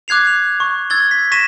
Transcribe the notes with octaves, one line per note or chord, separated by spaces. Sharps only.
D6 F#6 G#6 C7 F7
F7
C#6
E6 G#6 A6 G7
B6
C#6 A#6 B6 D#7 E7